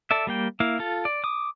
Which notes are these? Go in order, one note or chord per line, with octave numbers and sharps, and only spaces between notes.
A4 D5 E5
G3 A#3 G5
A#3 E4 F5
F4 A4
D5
D6 D#6